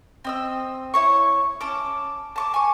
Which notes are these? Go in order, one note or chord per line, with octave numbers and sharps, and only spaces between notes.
C4 D#5 E6
E4 C#5 C#6
C#4 A5 D6
A5 C#6 D6
G#5 C#6